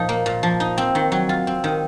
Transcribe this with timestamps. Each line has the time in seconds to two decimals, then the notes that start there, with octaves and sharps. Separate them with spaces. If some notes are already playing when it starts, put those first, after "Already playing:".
Already playing: A#2 F3 D#4
0.09 A#3
0.26 A#2
0.43 F3
0.60 D#4
0.78 C4
0.95 D#3
1.12 F#3
1.29 F4
1.47 C4
1.64 D#3